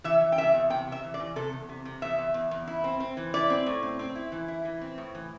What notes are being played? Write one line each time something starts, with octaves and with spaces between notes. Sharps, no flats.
E3 E5
E3
G5
C3 E5
E2
C3 G5
C3
E5
E3
D5
E3
C3 A4
E2
C3
C3
E2 E5
E2
E2
E2
E4
C4
C4
E3
E4 D5
C4
A2
C4
C4
E4
E3
E4
E3
C4
A2
E3